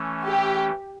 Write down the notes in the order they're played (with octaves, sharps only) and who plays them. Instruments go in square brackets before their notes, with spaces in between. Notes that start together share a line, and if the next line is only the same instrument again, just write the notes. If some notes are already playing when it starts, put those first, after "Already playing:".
Already playing: [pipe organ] E3 A3 C#4
[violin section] G4